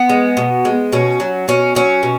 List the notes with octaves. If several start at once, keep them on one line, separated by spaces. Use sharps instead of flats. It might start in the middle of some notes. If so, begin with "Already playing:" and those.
Already playing: B3
G#3
B2
G#3
B2 C#4
F#3
B2 C#4
F#3 C#4
B2